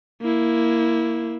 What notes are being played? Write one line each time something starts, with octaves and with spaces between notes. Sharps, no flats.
A#3 E4